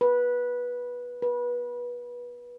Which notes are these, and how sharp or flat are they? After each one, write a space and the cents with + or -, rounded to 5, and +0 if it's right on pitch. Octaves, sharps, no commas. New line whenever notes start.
B4 -15
B4 -25